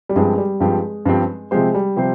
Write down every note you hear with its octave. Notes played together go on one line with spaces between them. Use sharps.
G3
G2 F3 G#3 C4 G4
G3
G2 F3 G#3 C4 G4
G2 F3 C4 G4
C3 F3 G#3 C4 G4 C5
G3
C3 F3 C4 G4 C5